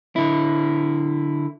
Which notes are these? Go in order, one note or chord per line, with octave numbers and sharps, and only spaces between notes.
D3 E4